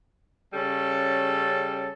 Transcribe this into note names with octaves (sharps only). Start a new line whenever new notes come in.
C#3 G3 C#4 A4